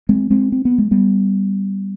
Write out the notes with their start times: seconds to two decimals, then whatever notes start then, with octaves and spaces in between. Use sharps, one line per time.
0.09 G#3 C4
0.30 G#3 C4
0.52 C4
0.65 B3
0.78 G#3
0.91 G3 B3